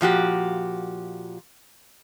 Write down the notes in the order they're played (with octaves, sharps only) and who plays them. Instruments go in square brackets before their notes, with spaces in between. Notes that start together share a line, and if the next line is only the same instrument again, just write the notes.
[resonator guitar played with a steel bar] A#2 F3 F#4 G4